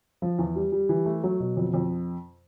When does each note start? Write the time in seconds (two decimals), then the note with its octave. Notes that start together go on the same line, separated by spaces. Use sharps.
0.22 F3
0.39 E2
0.56 G3
0.72 G3
0.89 E3
1.06 A3
1.23 F#3
1.40 B2
1.57 F2
1.74 F2